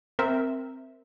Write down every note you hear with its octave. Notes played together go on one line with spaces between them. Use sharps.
C4 A#4 E5